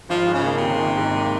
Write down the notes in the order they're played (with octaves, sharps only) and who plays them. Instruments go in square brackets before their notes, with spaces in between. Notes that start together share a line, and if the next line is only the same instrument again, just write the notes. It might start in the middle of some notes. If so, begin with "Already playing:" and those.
[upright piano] G#1 [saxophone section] F3
[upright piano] G#2
[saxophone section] C#3
[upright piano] A#3
[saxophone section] C3
[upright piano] D#3
G#1
G#2
A#3